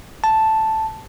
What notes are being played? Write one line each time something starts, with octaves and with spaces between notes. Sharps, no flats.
A5